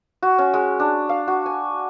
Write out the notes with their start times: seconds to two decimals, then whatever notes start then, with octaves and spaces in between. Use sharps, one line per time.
0.22 F#4
0.39 C#4
0.54 G#3
0.80 D4
1.09 F5
1.28 F#4
1.46 G#5